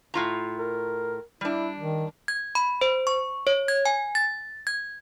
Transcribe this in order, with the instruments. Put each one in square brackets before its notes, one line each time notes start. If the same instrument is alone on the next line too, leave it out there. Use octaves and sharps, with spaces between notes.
[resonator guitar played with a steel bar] A2 F4 A#5
[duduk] A#4
[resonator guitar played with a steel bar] G3 D4 [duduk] E4
[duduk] D#3
[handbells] G#6
B5
C5
C#6
C#5
G#6
G#5
A6
G#6